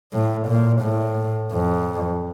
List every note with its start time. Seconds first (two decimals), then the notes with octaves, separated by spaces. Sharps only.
0.12 A2
0.48 A#2
0.82 A2
1.52 F2